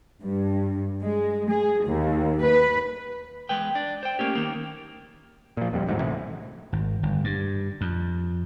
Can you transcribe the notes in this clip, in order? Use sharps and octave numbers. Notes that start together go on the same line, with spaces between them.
G2
G#3
G#4
D#2
B4
E2 G#3 B4 G5
D4
C5 G5
A3 A#3 C#4 G4
D#2 D#3 A#3
A#2 F3
D#1 F2 G3
D1 A1 G#2 F#3
A#1 A2 C3 E3
G#1
G1
G2
F2